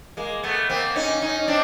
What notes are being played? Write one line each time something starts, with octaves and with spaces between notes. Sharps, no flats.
G#3 A#3
A3 B3
A#3 C4
C#4 D#4
C#4 D#4
C4 D4